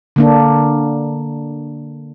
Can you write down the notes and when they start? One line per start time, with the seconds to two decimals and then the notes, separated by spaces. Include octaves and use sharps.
0.16 D3 A#3 D4